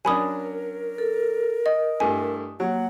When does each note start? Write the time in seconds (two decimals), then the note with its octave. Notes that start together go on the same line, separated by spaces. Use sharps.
0.05 F#3 C#4 D4 A#4 G#5 B5 D#6
0.98 A4
1.66 D#5 D#6
2.00 G2 A3 E4 G#5
2.60 F#3 A#3 F#5